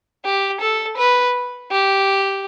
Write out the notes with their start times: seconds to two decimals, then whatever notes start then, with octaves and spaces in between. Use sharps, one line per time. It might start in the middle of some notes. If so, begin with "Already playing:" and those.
0.25 G4
0.61 A4
0.98 B4
1.71 G4